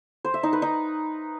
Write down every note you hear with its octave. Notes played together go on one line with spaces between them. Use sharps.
C5
E5
D#4
B4
D#4